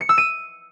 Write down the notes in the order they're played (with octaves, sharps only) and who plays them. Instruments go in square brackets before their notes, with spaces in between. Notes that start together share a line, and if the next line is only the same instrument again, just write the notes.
[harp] C#7
E6
D#7